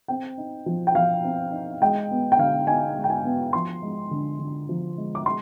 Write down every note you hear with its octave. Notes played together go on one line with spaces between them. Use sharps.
C4 G5
D#4
F3
G5
F3 F5
C4
D#4
G#3 G5
B3
G5
D3 F5
D#4 G#5
G#3
G5
G#5
B3
F3 C6
G#3
D3
D3
F3
G#3
D6
G#3 C6